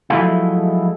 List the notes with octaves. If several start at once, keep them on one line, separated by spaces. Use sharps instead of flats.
F3 F#3 G#3 A3 E4